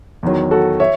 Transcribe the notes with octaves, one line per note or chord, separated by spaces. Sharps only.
E2 D#3 F#3
F#4 A4
C#5 E5